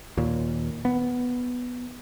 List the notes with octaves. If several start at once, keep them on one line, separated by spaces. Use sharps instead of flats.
D#2 A#2
B3